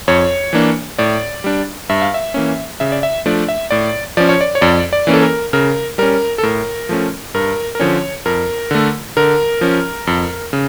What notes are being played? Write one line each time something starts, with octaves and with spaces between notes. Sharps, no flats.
F2 C#5
E3 A#3 D4
A2 D5
G3 D4
G2 E5
F5
E5
E3 A#3 C#4
C#3 E5
D5
E5
F3 A3 D4 D5
E5
A2 D5
F3 C#4 D5
C#5
D5
C#5
F2 D5
D5
E3 A#3 C#4
A4
A#4
C#3 A#4
G3 C#4 A#4
A4
A2 A#4
F3 A3 C#4
G2 A#4
A#4
D3 F3 C#4 C#5
F2 A#4
D3 A3
D3 A#4
F3 C#4
F2
C#3